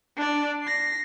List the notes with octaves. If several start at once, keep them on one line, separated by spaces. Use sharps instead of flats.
D4 D5
A#6 C7